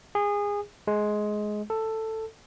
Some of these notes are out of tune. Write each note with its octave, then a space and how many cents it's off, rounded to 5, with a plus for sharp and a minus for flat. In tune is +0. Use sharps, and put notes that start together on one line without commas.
G#4 -25
G#3 +15
A4 +10